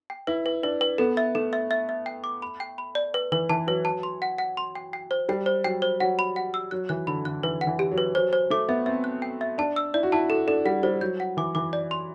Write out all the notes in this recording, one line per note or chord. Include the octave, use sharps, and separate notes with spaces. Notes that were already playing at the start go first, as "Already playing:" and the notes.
G5
E4 B4
B4
D4 B4
B4
B3 A4
E5
A3 A4
E5
E5
E5
G5
D6
B5
G5
B5
D5
B4
E3 B4
E3 A5
F#3 B4
A5
C6
F#5
F#5
C6
G5
G5
C5
G3 G5
C5
F#3 G5
C5
F#3 F#5
B5
F#5
E6
F#3 F#6
E3 F#6
D3 B5
D3 F#6
E3 B4
F#5
E3
G4
F#3
B4
F#3 C5
C5
A3 D6
B3 E5
C4 E5
F#6
G5
E5
D4 A5
E6
E4 D5
F#4
E4 A5
F#4 A4
D4 A4
G3 F#5
G3 C5
F#3 G6
F#5
E3 D6
E3 D6
D5
C6